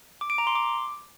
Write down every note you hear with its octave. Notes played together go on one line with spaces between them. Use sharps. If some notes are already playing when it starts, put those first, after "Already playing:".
D6
D7
A#5
C6
D6